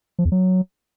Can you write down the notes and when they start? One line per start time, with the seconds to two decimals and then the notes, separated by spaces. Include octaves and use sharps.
0.19 F3
0.25 E2
0.32 F#3